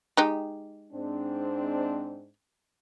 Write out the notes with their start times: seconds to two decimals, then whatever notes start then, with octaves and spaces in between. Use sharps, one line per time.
0.17 G#3 D#4 G4
0.93 G#2 C4 D4